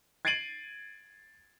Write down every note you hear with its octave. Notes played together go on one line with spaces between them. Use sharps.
G#6 A6 C7 D7 D#7 F#7